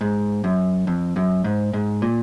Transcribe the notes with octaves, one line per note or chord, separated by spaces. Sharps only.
G#2
F#2
F2
F#2
G#2
G#2
A#2